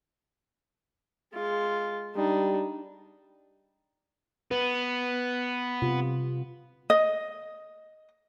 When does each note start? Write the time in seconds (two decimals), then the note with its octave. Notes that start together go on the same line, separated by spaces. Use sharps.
1.33 G#3 F4
2.15 G3 D4 D#4
4.51 B3 B4
5.82 C3 F4
6.90 D#5